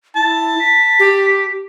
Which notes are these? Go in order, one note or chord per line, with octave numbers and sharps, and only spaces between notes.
E4 A5
B6
G4